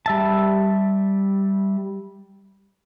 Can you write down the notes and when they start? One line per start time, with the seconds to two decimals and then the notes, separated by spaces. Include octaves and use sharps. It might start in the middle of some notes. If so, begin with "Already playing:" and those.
0.06 G3 E5 A5